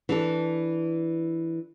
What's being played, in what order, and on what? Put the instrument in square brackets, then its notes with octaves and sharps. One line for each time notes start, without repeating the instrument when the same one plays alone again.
[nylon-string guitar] E3 D4 A4